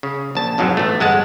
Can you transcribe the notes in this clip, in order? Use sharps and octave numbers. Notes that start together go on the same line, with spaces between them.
C#3
A#1 A5
B1 F2 G#2 F#3
A1 A3
G1 G#3 F#5 A5